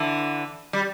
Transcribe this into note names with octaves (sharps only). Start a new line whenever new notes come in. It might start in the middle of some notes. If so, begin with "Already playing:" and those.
Already playing: D3 E3
G3